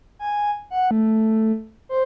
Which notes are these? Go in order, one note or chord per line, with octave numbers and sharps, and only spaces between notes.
G#5
F#5
A3
C5